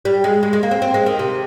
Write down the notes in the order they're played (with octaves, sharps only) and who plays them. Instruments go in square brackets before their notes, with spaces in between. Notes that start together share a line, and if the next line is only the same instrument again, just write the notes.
[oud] G3
G#3
G#3
G#3
A#3
C4
C4
G#3
D#3
C3